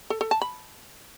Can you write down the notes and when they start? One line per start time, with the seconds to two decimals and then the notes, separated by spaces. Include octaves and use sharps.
0.10 A4
0.21 A4
0.31 A5
0.42 B5